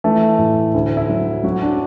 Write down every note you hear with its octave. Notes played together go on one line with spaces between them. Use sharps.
E3 A3
A2
D2
E4
F#3
F#3 F#4
D4